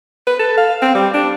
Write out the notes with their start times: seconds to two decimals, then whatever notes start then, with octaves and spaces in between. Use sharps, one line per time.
0.27 B4
0.39 A4
0.57 F5
0.82 C4
0.95 G3
1.14 D4